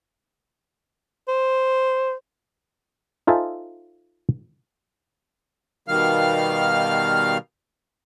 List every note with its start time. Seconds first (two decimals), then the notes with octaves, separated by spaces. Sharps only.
1.28 C5
3.27 D#4 F4 A4 C5 E5 G#5
5.88 B2 D#3 G3 F5 F6